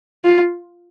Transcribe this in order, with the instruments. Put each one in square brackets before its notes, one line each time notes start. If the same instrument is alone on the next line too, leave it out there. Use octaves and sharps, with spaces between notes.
[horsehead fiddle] F4